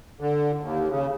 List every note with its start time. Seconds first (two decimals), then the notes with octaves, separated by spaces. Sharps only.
0.20 D3
0.62 D#2
0.90 C#3